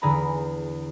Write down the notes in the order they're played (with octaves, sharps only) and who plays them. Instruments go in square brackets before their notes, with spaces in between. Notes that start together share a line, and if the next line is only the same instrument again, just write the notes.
[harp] E2 D3 G#4 B4 A#5 B5